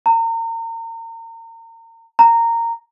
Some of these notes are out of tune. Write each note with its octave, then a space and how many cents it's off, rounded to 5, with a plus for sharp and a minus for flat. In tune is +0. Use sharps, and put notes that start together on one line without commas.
A#5 -35
A#5 -15